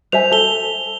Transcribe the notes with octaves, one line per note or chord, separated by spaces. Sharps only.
C5 E5 G#5 F7
A4 G7